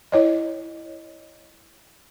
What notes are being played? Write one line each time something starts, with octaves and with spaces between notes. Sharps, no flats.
E4 C#5 D#5